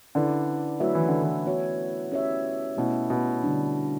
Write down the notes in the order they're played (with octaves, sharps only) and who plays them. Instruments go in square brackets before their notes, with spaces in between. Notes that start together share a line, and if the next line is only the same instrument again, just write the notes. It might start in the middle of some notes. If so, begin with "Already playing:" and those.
[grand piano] D3 [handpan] C#4 E4 B4 D5
[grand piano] F#3 [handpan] A3 E4 B4 E5
[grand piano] E3
D3
E3
[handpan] B3 F#4 C#5
C#4 G4 C#5 E5
[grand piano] B2 [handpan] A3 C#4 E4
[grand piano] B2
[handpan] D3 G3 D4